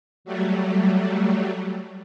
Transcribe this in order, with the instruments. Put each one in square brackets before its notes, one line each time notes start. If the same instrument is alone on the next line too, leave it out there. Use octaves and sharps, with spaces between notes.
[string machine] F#3 G3 A3